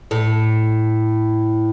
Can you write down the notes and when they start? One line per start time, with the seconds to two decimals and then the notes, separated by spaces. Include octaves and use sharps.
0.11 A2